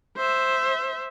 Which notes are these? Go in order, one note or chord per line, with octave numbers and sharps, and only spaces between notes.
C5 E5